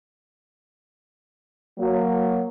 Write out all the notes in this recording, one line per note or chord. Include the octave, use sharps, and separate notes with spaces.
F#3 A#3